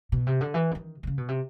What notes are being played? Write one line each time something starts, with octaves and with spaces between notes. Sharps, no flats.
B2
C3
D3
E3
D3
D#3
C3
C#3
B2
C3